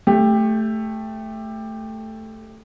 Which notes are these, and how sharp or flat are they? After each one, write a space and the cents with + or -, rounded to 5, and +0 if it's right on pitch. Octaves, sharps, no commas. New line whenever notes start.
A3 +0 G4 +15